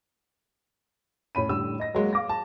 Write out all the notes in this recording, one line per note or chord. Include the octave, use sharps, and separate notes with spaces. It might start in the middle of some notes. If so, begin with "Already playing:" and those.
A2 C#4 B5 D#7
A2 D3 G3 E6
D#5 A#6
F#3 G#3 A#3
F5 D6 A#6
A5